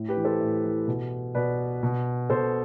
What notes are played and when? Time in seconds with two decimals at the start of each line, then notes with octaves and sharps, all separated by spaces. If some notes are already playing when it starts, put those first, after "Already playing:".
Already playing: A2
0.09 G4 B4
0.17 E3
0.24 A4 C5
0.40 A2
0.65 E3
0.88 B2
1.35 B2 B4 D5
1.83 B2
2.30 B2 A4 C5